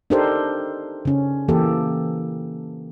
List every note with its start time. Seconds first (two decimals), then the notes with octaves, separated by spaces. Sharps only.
0.10 D4 D#4 G4 A4 A#4 C5
1.05 C#3 C#4
1.48 E3 A#3 G4 A4